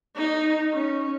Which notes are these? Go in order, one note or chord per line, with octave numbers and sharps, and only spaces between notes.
D#4
C#4